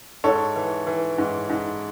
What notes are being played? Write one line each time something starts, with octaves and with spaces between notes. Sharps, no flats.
G#2 A4 C#5
E3
E3
G#2
G#2